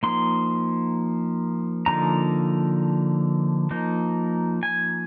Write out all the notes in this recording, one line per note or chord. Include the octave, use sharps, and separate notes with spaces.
F3 A#3 D#4 C6
D3 F3 A#3 D#4 A#5
F3 A#3 D#4
G#5